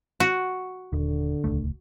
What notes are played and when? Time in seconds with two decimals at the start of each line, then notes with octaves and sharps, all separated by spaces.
0.20 F#4
0.93 D#1 D3
1.44 D#1 C#2 A3